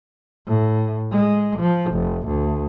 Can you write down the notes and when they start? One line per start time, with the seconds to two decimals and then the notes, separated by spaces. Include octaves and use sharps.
0.47 A2
1.11 G#3
1.59 F3
1.92 F1
2.28 D2